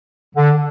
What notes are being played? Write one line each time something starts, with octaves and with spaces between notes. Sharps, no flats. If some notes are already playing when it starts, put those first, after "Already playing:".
D3